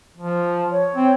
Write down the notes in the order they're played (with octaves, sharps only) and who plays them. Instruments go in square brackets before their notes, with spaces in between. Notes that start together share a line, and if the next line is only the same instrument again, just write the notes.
[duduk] F3
[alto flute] C#5
[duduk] C4